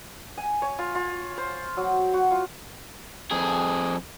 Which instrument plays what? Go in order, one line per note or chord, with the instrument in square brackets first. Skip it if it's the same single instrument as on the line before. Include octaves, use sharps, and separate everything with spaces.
[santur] G#5
C#5
F4
F4
C5
F#3
F#4
F4
[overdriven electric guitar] F2 G#4